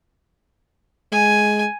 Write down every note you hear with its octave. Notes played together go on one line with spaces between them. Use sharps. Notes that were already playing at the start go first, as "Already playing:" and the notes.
G#3 G#5